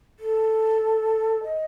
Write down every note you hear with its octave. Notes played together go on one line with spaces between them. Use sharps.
A4
D#5